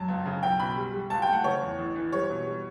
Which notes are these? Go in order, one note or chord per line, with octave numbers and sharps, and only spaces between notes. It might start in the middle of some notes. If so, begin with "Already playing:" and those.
Already playing: F#2 A5
C#2
C#3
B1 G5
B2 B5
G3
G3
C#2 A5
G5
A3
F#5
C#3 C#5
E2
A1
E3
G3 C#5
B2
G3